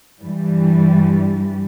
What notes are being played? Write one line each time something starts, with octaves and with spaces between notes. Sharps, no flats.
G2 E3 G3